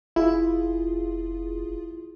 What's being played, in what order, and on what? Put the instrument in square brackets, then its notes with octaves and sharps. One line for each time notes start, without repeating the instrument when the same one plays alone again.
[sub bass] F1 [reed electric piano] E4 [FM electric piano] F4 G#4